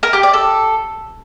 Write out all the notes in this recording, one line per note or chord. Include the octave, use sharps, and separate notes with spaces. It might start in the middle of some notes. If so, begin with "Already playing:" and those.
A#4
G4
D5
A4